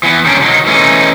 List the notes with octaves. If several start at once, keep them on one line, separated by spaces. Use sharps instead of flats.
E3 B3
D#3 G3 C#4 D4
D#3 F#3
E3 A3 C#4 D#4 G#4